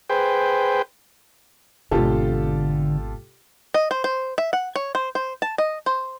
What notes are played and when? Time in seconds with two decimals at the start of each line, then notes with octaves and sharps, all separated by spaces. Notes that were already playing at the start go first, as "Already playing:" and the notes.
0.10 G#4 B4 C5 G5
1.91 G#1 B2 D3 F4 G4 A4
3.74 D#5
3.91 C5
4.04 C5
4.38 E5
4.53 F#5
4.76 C#5
4.95 C5
5.15 C5
5.42 A5
5.58 D#5
5.86 C5